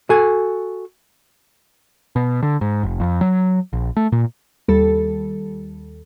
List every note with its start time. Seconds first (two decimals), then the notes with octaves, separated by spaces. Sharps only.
0.10 F#4 A4 G#5
2.16 B2
2.43 D3
2.61 G#2
2.83 F1
3.00 F2
3.21 F#3
3.73 A#1
3.96 A3
4.12 A#2
4.68 D#2 G3 A4